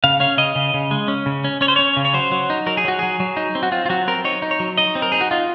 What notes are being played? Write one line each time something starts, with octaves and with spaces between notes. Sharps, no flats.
C#3 F5
C#4 F5
C#3 D#5
C#3
C#3
G#3
C#4
C#3
C#4
C#4 C#5
C5
C#4 C#5
C#3
C#5
F#3 C5
F#3
D#4
F#3 A#4
G#4
F#3 F#4
F#3 G#4
F#3
D#4
C4
F#4
C4 F4
F4
F#3 F#4
C4 A#4
D#4 C#5
D#4
C#5
F#3
D#4 D#5
C4
A#4
D#4 G#4
F#4
D#4 F4